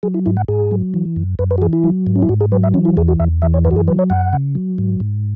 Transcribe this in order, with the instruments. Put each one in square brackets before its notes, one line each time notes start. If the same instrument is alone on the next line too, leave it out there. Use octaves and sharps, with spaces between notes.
[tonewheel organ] F#3 G#4
E4
G#2 E4
F#5
G#2 G#4
F#3
E3
F#2
F#2 B4
B4
F#4
E3 G#4
E4
F#3
G#2
C#4
E4
G#2 F#4
G#4
F#3 B4
E5
E3 C#4
E4
E2 G#4
F#4
E2 E5
E3 E5
C#5
F#2 B4
F#4
G#4
F#3 B4
C#5
F#2 F#5
C#3
F#3
G#2
G#2